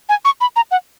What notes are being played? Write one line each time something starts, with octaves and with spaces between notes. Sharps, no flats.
G#5
C#6
B5
A#5
F#5